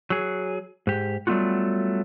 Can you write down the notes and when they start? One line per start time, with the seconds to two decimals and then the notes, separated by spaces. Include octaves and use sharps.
0.10 F#3 G#4
0.87 G#2 G4
1.27 F#3 G3 A3 B3 F4 F#4